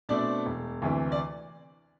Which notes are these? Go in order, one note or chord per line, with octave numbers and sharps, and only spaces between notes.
B2 A3 C4 D4 D5
E1
D2 C3 E3
D5